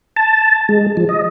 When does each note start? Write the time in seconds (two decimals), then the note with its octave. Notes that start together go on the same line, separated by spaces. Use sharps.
0.16 A5
0.69 G#3
0.97 F3
1.09 D#5